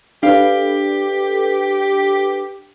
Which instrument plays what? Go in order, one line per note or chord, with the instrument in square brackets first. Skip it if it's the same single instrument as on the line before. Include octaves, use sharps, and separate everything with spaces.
[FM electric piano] D4 A4 B4 [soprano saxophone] G4 [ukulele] F5